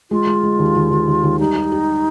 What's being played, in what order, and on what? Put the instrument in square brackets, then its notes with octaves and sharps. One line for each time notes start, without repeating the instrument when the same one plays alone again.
[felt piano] G#3 [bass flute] F4
[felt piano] G#3
G#3
D#2
D#2
D#2
D#2
D#2
[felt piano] G3 [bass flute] D#4
[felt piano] G4
G4